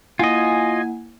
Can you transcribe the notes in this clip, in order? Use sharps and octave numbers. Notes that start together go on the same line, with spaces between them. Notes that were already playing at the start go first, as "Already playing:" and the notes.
A#3 E4 F4 D#5 F#5 G#5